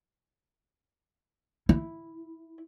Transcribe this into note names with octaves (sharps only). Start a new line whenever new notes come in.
E4